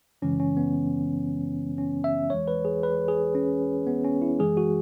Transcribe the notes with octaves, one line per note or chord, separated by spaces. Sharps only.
F#2 C#3 E3 G#3 C#4
C#4
B3
C#4
E5
E2 E3 G#3 C#5
B4
G#4
B4
G#4
C#4
B3
C#4
E4
F#2 E3 G#3 G#4
F#4